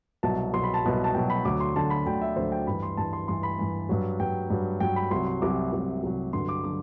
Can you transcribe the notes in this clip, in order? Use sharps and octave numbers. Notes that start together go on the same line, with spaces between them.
C2 B2 F#3 A5
C2 B2 F#3 C6
B5
A5
C2 B2 F#3
A5
C2 B2 F#3 G5
B5
D2 D3 F#3 D6
C6
D2 D3 F#3 A5
B5
D2 D3 F#3 G5
E5
D2 D3 F#3 C5
G5
G2 E3 B5
C6
G2 E3 A5
C6
G2 E3 C6
B5
G2 E3
G2 F#3
G2 F#3 G5
G2 F#3
G2 F#3 G5
B5
C2 C3 F#3 C6
C6
C2 C3 F#3 D6
C2 C3 F#3
C2 C3 F#3
G2 D3 F#3 C6
D6
D3 F#3 D6